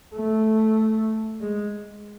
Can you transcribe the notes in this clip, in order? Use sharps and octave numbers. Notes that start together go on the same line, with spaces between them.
A3
G#3